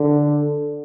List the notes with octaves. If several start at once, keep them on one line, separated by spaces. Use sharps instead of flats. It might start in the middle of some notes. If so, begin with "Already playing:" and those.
Already playing: D3